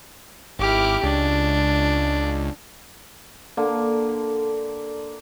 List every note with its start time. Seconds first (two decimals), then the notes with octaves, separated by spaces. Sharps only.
0.59 G#1 E4 G4 D6 F6
1.04 C#2 D4
3.57 D3 A#3